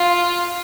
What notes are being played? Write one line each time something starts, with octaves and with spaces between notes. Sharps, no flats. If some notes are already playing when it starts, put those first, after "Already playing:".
Already playing: F4